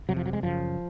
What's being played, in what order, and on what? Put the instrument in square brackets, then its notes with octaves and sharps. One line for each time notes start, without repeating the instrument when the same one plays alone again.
[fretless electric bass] F2 C3 F#3
F3
F#3
G#3
F#2 C#3 F3